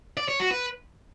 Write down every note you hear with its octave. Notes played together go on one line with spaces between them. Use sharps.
D5
C#5
F#4
B4